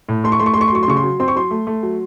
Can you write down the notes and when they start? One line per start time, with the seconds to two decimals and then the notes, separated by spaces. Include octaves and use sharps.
0.09 A2
0.24 A3 C6
0.32 C#6
0.40 A3 C6
0.46 C#6
0.54 A3 C6
0.61 C#6
0.68 C6
0.72 F#3 C#6
0.83 C6
0.88 C#3 C#6
0.97 C6
1.03 F#3
1.20 C4 C6
1.28 C#6
1.36 F#3 C6
1.51 A3
1.67 A3
1.83 F#3